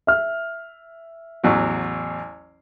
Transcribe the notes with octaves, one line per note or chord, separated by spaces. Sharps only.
E5 F6
A1 E2 F#3